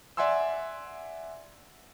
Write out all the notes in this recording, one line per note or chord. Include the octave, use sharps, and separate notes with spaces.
D5 E5 F#5 G#5 C6 E6